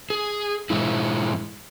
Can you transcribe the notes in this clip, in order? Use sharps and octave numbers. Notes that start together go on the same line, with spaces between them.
G#4
G#2 C#3 E3 G#3 E4